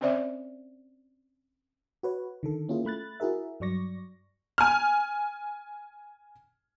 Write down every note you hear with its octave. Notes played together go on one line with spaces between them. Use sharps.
C4 C#4 C5 D5 E5
F#4 B4 C#5
D3 D#3 A4
A#3 C#4 E4 F4 G#4
A3 B5 F#6 A6
E4 F#4 G#4 A#4 E5
G2 F#3 D5 C#6 A#6
G#5 F6